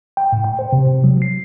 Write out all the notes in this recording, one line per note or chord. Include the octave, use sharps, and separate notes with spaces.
G5
A2
G5
C5
C3
C3
F#3
C7